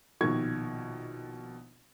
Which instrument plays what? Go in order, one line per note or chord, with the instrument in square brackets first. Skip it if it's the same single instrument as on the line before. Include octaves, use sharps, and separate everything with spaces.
[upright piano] A#1 B2 D#3 C#6 G#6